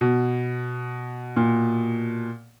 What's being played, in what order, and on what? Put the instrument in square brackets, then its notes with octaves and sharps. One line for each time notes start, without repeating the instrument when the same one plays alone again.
[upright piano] B2
[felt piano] A#2